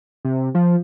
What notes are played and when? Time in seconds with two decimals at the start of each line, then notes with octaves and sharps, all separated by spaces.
0.25 C3
0.55 F3